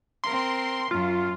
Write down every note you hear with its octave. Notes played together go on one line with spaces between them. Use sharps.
C4 A#4 C6
F#2 F4